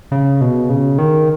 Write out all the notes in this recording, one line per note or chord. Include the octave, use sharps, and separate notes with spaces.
C#3
B2
C#3
D#3